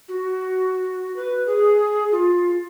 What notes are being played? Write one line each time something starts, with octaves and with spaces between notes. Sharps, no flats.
F#4
B4
G#4
F4